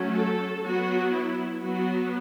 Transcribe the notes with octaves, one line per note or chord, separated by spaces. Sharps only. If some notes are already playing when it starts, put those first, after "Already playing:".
Already playing: F#3 A3 C#4
A4
F#3 B3 F#4
E4
F#3 B3 F#4